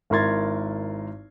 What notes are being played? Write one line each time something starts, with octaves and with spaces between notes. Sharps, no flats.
G#1 E4 A#4 C6 G#6 A6